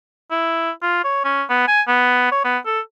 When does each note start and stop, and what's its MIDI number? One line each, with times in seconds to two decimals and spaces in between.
0.31 0.71 64
0.82 1.02 65
1.04 1.24 73
1.24 1.43 61
1.49 1.66 59
1.68 1.81 80
1.88 2.31 59
2.32 2.44 73
2.44 2.58 59
2.66 2.80 69